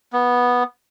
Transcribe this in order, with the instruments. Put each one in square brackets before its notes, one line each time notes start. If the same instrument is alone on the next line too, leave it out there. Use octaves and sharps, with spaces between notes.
[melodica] B3